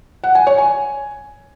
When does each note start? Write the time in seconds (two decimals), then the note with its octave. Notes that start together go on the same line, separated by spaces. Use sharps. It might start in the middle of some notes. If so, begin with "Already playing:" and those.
0.24 F#5
0.35 G#5
0.47 C#5
0.58 G#5